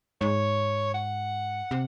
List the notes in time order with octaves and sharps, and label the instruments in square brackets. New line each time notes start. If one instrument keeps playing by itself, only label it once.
[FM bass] G#2 [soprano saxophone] C#5
[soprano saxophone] F#5
[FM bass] C3